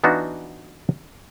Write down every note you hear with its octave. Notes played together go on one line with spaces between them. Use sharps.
E3 B3 D4 D#4 F4 F#4